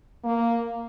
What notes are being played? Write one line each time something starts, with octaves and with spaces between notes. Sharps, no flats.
A#3